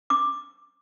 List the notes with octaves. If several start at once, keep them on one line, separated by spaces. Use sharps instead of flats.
D6